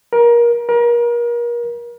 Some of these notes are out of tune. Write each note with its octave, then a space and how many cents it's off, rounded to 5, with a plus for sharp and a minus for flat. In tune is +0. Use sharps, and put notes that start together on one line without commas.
A#4 +25
A#4 +35